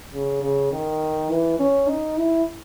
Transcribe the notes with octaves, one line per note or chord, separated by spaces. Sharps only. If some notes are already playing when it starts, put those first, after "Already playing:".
C#3
C#3
D#3
E3
C#4
D#4
E4